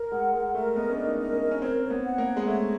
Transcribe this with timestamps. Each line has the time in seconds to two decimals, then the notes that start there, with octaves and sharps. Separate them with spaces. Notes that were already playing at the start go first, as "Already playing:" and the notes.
Already playing: A#4
0.12 G#3 F#5
0.33 G#3 A#4
0.55 A3 A#4
0.76 B3 D#5
0.89 C#4
0.96 D4 A#4
1.04 D#4
1.19 D#5
1.33 C#4
1.41 A#4
1.51 C#4
1.61 C4 C#5
1.83 C#5
1.90 B3
2.05 F#5
2.18 A#3
2.25 C#5
2.37 G#3
2.47 A3 C#5